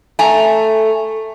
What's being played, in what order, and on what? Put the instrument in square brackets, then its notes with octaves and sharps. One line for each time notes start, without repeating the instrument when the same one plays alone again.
[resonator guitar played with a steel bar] A3 G#5 A#5